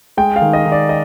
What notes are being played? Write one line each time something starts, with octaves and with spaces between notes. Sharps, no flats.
G#3 G5
F5
D#3
D#5
D#3
D5
D#5